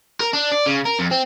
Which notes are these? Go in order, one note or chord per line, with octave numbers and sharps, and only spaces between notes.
A#4
D4
D5
C#3
A#4
F2
C4